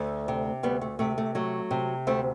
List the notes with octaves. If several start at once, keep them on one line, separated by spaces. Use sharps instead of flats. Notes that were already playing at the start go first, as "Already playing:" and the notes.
Already playing: D2 A3
C3
D2 G3 B3
A3
C3 A3
A3
F#3 A3
C3
D2 A3 C4